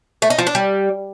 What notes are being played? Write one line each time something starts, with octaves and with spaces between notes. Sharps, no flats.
A3
D#4
F3
D4
G3